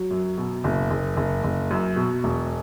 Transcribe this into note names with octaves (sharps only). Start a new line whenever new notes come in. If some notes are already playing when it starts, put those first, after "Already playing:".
Already playing: F#3
F#2
B2
F#1
F#1
F#1
F#1
F#2
B2
E1